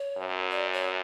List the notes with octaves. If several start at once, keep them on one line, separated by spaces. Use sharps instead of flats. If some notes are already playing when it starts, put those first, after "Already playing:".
Already playing: C#5
F#2
D5
C#5